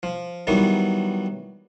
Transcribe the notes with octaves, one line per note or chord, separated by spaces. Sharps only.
F3
D#3 E3 F#3 G3 B3